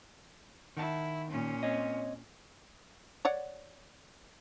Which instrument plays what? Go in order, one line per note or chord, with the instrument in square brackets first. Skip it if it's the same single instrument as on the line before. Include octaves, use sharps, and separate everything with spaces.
[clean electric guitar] D#3 F#5 A5 [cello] E4
[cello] A#2 C#4
[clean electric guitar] C4 C#5 D#5
[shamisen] C#5 D5 F#5